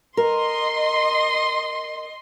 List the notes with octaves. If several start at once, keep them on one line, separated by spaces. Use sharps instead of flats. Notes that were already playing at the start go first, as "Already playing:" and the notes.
A#4 D#5 C6